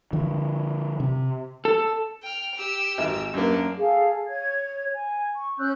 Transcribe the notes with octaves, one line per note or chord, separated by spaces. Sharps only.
D3 F3
C3
A4
G5 F6
G4 E6
G#1
F#2 A#3 C#4 D4
G#4 A4 F5
C#5 G#6
G#5
C#6
C#4 E6 F#6 G6